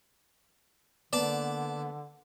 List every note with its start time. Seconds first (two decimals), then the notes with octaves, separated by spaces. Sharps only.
1.13 D3 A#3 B3 D5 A5